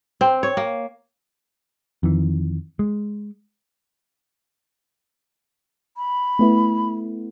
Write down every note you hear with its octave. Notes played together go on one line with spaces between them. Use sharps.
C4
C#5
A#3
F2 D#3 E3
G#3
B5
A3 B3 E4